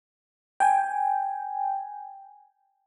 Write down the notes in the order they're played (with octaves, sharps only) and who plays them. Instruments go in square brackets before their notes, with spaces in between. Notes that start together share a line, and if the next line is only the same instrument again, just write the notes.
[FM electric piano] G5 G#5